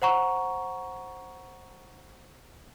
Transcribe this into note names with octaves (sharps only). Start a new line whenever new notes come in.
C5 F#5 A#5 C#6